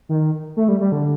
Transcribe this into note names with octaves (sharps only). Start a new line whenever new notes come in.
D#3
A3
G3
G3
D3